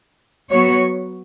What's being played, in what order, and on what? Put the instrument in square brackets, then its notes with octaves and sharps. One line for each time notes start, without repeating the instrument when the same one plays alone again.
[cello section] F#3 B3 F#4 C#5